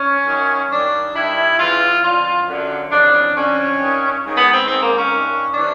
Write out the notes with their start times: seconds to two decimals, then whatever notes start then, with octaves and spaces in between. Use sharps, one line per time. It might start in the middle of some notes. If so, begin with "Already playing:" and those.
Already playing: C#4
0.26 F#2 D#3
0.70 G2 D#3 D4
1.14 G2 D#3 E4
1.58 E2 C#3 E3 F4
2.02 F2 D3 F4
2.46 F#2 D3
2.90 F2 C#3 E3 D4
3.34 F2 D3 C#4
3.77 G2 D#3
4.23 G#2 D#3
4.37 B3
4.52 C4
4.65 G#2 D#3 C4
4.80 A#3
4.95 C#4
5.10 G2 D#3
5.54 C3 E3 D4